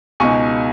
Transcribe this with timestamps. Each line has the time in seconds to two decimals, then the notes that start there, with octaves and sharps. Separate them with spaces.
0.20 C#2 B2 G#3 D#4 G#5 C#6